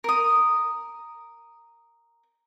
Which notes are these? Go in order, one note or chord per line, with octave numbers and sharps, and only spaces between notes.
A#4 D#6